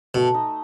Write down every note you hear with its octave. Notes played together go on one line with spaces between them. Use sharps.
B2 A3
D#4